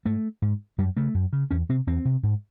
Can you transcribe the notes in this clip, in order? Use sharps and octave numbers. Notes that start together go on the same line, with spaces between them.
G#2 A3
G#2
F#2 G3
C#3 A3
F#2
C#3
E2 C#4
C3 C4
E2 C4
C3
G#2